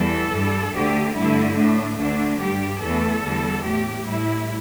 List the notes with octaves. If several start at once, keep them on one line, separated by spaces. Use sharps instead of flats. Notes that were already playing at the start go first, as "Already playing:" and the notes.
Already playing: E2 E3 G3 A4
G2 G3
D2 D3 A3 G4
G2 D3 A3 E4
A2 A3 D4
D2 D3 A3 D4
G2 G3 G4
E2 E3 A3 A4
E2 D3 G3
A2 A3 G4
A2 G3 E4